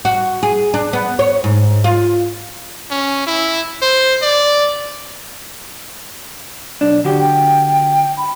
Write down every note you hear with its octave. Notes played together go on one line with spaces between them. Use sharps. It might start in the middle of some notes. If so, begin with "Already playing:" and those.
F#4
G#4
D4
B3
C#5
G#2
F4
C#4
E4
C5
D5
B1 D4
D3 F#4 G4
G5
B5